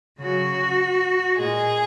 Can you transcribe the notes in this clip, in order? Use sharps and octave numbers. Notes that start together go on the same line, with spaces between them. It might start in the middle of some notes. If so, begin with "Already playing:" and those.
C#3 F#3 F#4
A#2 G#3 G#4